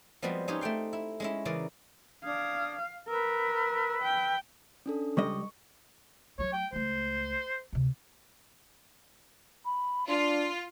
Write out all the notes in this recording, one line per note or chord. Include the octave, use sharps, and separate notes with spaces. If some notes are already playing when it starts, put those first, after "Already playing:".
F3 G3 G#3 B3 C4 F#4
C#4 D#4 F4 G4 G#4 C#5
A3 C4 G5 C6
E4
G#3 C#4 E4
C#3 E3 A#4 D5
D4 F5 D#6 G#6
A#4 B4 E6
G5
C#4 D4 A4
C#2 G3 D#5 C#6
F#3 A3 C#5
G5
C#2 A3 C5
D2 C3
B5
D4 F4 C6